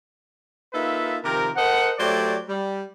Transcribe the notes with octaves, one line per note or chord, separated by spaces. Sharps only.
A#3 D#4 F4 A4 B4 E5
C3 D#3 F3 G4 A#4
A4 A#4 C5 D#5 F#5
F#3 A3 G4 C5 D5
G3